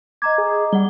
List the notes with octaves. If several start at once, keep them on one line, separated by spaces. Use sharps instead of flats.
D#5 A#5 D6 G#6
G#4
G3 G#4 F#5 G7